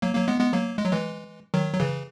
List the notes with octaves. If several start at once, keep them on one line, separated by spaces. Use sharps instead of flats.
F#3 A#3
F#3 A#3
G#3 B3
G#3 B3
F#3 A#3
G#3
F#3
E3 G#3
D#3 F#3
F#3
C#3 E3